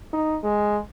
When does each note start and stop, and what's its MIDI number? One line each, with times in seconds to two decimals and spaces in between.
0.13 0.38 63
0.44 0.78 56